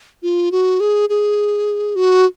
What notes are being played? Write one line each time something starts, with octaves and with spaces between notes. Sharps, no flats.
F4
F#4
G#4
G#4
F#4